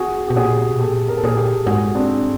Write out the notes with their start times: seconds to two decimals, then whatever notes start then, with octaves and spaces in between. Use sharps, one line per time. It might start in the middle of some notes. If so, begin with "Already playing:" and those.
Already playing: F#4 G#4
0.28 B2 G4
0.36 A#2 F#4 G#4
0.69 B2
0.79 A#2 G4 A4
1.08 A#4
1.17 A4
1.24 A#2 G#4 A#4
1.37 G4 A4
1.66 G#2 F#4 G#4
1.95 C4 D4